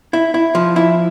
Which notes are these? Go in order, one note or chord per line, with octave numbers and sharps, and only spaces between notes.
E4
E4
F3
E4